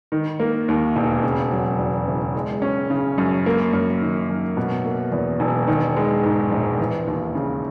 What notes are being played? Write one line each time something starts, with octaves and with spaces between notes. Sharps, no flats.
D#3
A#3
D#2
E1
C#3
F#3
E2
F#1
G#3
C#4
C#3
F#2
A#3
F#2
D#3
F#2
B2
A#3
E2
E1
D#3
G#3
G#2
A#1
E3
D#2
C#3